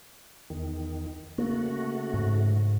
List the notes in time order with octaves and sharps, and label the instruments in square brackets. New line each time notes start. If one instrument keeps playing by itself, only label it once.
[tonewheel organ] E2 D#3
[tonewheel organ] C#3 A3 F#4 [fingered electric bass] A#3
[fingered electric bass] G#2